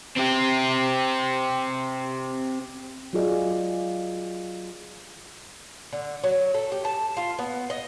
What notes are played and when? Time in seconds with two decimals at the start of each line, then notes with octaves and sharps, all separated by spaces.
0.16 C4 G4
3.13 F#3 F4 G#4 D5 D#5
5.93 D3
6.24 F#3
6.54 A4
6.72 G4
6.85 A5
7.17 F4
7.39 B3
7.70 D#5